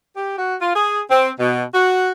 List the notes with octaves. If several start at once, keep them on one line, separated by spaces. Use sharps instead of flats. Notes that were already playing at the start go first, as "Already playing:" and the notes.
G4
F#4
F4
G#4
C4
B2
F#4